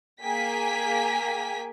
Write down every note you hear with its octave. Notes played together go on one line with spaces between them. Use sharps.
A#3 G#4 G5 G#5 B6